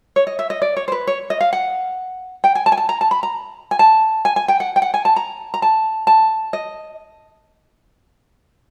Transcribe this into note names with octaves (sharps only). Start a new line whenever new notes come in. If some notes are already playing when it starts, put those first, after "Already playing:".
C#5
D#5
E5
D#5
D5
C#5
C5
B4
C#5
D#5
F5
F#5
G5
G#5
A5
G#5
A5
A#5
A5
B5
A#5
G#5
A5
G#5
G#5
G5
F#5
G5
F#5
G#5
A5
A#5
A#5
A5
A5
D#5